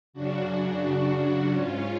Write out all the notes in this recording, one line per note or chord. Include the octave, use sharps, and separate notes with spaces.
F#2 C#3 D4 F#4
G#2 C#4 F4